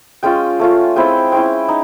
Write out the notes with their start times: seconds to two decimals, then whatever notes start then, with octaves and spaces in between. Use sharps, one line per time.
0.23 G#3 C#4 F4 G5
0.59 A3 C#4 F4
0.96 G#3 C4 E4 G5
1.32 G#3 C#4 E4 G5
1.68 D#4